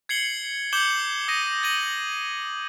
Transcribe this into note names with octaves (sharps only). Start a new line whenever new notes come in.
G#6 C7 C#7 F#7 G7
D6 G6 C#7 E7 F#7 G7
D#6 A#6 D#7
G#6 A#6 D#7 F#7